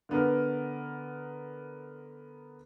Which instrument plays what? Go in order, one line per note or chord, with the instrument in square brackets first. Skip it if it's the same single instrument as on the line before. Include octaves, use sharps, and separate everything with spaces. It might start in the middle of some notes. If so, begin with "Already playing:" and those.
[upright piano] D3 B3 A#4